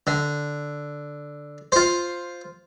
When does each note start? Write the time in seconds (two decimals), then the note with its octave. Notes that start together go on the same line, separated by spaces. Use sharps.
0.07 D3
1.72 F4 C5